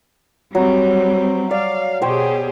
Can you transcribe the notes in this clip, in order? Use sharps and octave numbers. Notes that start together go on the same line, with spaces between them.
F#3 G3 C4
D5 F5
B2 G4 G#4 C5 C#5 G5